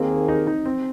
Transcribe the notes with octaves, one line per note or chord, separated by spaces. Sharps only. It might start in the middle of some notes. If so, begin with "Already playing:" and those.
Already playing: D#2 D#3 A#3 C4 G#4
D#4
D#4
C4